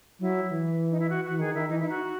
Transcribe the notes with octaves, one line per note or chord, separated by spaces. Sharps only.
F#3 E4
E3
D#4
E4
F#4
E3 F#4
D#3 G#4
D#3 E4
E3 D#4
E4
D#4
F#4